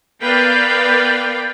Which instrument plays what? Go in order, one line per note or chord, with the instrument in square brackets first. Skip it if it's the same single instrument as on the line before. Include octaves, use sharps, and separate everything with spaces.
[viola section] B3 A#4 B4 D5 F5 G5